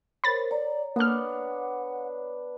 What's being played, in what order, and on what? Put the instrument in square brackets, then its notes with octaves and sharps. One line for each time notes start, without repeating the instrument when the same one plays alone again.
[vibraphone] A#4 C5 C#5 [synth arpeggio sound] B5 A6
[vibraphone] C#5 [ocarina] D5 [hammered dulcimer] A#5
[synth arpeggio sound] A#3 F6 [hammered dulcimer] B3 D4 [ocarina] F#5